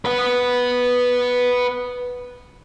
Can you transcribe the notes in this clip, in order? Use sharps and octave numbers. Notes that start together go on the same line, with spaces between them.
B4 F#5